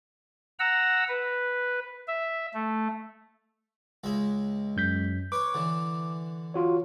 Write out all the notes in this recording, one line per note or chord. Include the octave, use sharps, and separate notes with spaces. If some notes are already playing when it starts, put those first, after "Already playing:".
F#5 A#5 E6
B4
E5
A3
C#2 G#3 E5
F#2 G6 B6
B4 C#5 D6
D3 E3
F4 F#4 C#5